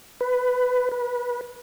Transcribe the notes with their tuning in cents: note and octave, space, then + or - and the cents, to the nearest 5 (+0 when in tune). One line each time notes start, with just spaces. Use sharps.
B4 +15
B4 -25